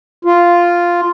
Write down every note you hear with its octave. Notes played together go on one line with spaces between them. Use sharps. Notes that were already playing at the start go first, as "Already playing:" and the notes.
F4